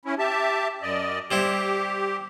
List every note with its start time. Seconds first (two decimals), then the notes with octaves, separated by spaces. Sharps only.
0.05 C#4 E4
0.19 G4 E5 A5
0.82 F#2 D5 D#5
1.31 G3 C4 E4 G4